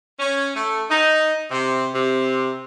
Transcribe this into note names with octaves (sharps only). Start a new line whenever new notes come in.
C#4
A3
D#4
C3
C3